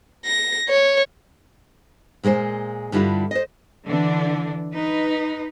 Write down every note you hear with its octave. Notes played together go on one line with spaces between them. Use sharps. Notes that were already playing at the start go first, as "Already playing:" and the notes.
A#6
C#5
A#2 G#3 A#3 A#4 C5
G2 D3 G3 E4 F4
C5 D#5
D3 E3 D4
D#4 B4